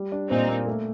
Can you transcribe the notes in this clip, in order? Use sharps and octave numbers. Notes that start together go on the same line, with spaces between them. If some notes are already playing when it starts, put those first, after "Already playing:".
Already playing: G3
D4
A#2 C4 D#4
A#3
A3